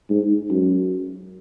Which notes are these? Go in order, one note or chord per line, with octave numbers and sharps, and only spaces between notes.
G#2
F#2